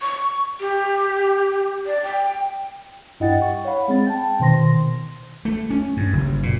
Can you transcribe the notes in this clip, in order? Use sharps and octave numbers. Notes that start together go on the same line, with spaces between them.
C#6
G4
D5
G5
G2 E4 D#5 F#5 G5 A6
C#6
C#5 F5 F#5 B5
G#3 C4 A6
G5 A5
B2 D#3 C5 C6 A#6
A3
C#4
G2
F#1
A#2